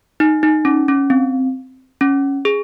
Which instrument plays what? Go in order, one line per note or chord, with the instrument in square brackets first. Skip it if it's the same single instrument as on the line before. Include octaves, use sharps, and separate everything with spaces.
[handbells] D#4
D#4
C#4
C#4
C4
C#4
G#4